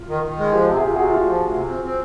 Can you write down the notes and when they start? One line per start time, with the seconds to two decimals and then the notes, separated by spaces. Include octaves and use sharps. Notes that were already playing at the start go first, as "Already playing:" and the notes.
Already playing: F4
0.09 D#3
0.23 D#3
0.38 G#3
0.52 F3 F4 G4
0.67 C3
0.77 G#4
0.81 C3 F4 G4
0.96 C3 F#4 G#4
1.11 D2 F4 G4
1.25 F3
1.40 D2
1.54 C3
1.69 C4
1.84 C4